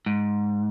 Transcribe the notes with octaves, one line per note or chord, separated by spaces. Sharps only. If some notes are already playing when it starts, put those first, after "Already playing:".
G#2